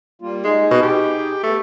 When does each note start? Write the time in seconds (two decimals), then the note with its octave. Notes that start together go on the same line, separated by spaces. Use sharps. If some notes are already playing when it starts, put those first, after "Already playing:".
0.22 G3 A#3 F4
0.44 G#3 D#4 G#4
0.71 B2
0.83 G4
1.43 A3 B3